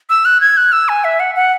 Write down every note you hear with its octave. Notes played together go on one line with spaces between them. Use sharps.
E6
F#6
G#6
F#6
E6
G#5
E5
F#5
F#5